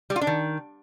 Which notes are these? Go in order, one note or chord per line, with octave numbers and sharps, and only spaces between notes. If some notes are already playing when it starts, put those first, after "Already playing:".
G3
F4
D4
D#3